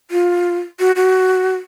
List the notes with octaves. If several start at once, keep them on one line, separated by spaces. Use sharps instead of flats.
F4
F#4
F#4